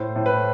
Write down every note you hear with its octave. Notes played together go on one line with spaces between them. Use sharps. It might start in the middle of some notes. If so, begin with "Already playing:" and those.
Already playing: A2 C5
A2
B4